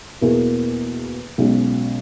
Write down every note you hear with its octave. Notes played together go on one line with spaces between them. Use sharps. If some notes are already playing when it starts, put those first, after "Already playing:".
E2 B2 A#3 E4 G#4
B1 B2 G#3 C#4